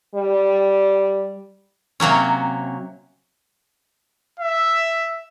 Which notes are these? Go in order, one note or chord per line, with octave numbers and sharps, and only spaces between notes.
G3
C3 F#3 A#3 C#4
E5